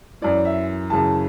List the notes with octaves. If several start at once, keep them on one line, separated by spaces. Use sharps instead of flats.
F#2 E3 D5
E5
F#2 C#3 E3 A5